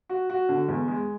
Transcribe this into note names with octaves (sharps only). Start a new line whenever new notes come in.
F#4
F#4
D3
E2
G#3